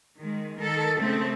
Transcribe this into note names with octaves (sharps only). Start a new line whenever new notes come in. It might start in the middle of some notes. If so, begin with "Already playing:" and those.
D#3 G#3
D#3 A4 A#4
C#3 A3 C4